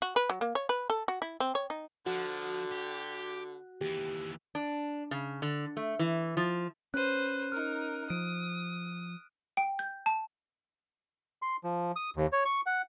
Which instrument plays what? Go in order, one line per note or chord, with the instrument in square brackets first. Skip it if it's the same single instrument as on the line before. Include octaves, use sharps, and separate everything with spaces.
[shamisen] F#4
B4
F#3
A#3
C#5
B4
A4
F#4
E4
C4
C#5
D#4
[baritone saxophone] D3 [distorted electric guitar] F3 [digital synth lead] F#4
[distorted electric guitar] G4
[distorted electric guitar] D#2 E3 [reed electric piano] G4
[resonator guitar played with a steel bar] D4
C#3
D3
A3
E3
F3
[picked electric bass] C#4 [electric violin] B4 C5 [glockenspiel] F#6 D#7
[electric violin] D#4 A#4 [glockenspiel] F6
[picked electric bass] F3 [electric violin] D#6 [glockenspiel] D7
[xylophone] G5
G6
A5
[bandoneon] C6
F3
D#6
D#2
C#5
C#6
F#5